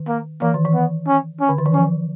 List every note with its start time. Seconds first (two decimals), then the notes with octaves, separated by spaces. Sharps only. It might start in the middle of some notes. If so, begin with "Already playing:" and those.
Already playing: D#3
0.08 A#3
0.42 E3 A#3
0.54 D#3
0.65 E3
0.74 B3
1.07 C#4
1.41 C#4
1.49 D3
1.58 D#3
1.66 E3
1.74 F3 C#4